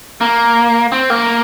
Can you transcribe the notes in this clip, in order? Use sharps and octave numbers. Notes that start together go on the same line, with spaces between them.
A#3
C4
A#3